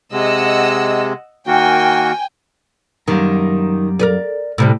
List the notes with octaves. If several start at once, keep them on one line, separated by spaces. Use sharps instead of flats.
C3 G#3 D#5 F#5 E6
D#3 A#3 F#4 G5 G#5
F#2 D#3 G3 A#3
A#4 B4 D5
A2 C3 G3